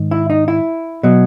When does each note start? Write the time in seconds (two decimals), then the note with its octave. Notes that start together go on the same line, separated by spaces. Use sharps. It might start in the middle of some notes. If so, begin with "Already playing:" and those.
Already playing: G#2 D#3
0.11 E4
0.30 D#4
0.48 E4
1.03 B2 F#3